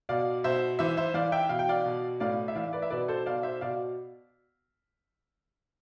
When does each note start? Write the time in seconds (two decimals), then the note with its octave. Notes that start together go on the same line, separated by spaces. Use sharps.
0.09 B2 D5 F5
0.44 B2 C5 E5
0.79 E3 C5 E5
0.97 C5 E5
1.14 E3 D5 F5
1.32 E5 G5
1.49 B2 F5
1.59 G5
1.69 D5 F5
1.86 B2
2.20 A2 D5 F5
2.48 E5
2.55 E3 D5 F5
2.73 B4 D5
2.82 E5
2.90 B2 B4 D5
3.08 A4 C5
3.26 B2 D5 F5
3.43 C5 E5
3.61 B2 D5 F5